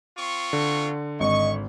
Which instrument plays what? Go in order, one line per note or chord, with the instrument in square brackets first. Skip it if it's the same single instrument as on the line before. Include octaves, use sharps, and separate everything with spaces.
[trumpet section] C4 F4 C#6
[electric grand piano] D3
[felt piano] G#1 [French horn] D#5 [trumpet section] C#6